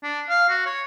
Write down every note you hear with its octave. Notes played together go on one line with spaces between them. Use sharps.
D4
F5
F#4
C#5